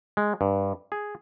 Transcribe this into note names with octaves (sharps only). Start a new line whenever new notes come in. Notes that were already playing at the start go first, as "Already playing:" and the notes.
G#3
G2
G#4